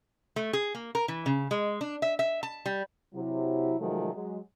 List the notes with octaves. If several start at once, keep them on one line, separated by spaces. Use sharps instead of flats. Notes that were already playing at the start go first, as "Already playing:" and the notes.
A3
G#4
A#3
A#4
E3
C#3
G#3
D4
E5
E5
A5
G3
C3 F#3 E4
C3 D#3 F3 F#3 G#3 A3
F#3 G#3